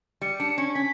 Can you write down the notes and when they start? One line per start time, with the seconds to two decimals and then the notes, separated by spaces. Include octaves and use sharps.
0.21 G3 C#7
0.40 D4
0.58 C#4
0.74 C#4 B6